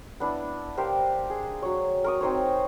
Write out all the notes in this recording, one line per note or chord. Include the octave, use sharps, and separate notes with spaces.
B3 D4 E4
G4 A#4 C5 F5
G#4
F#3 C#5
A#4 C#6 D#6
C4 D#4 C5 C#5